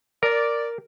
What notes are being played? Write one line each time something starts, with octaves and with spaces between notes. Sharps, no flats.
A#4 D5